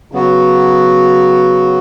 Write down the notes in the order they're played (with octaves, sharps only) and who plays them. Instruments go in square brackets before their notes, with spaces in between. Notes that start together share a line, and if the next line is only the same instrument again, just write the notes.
[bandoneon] C#3 F#3 B3 F#4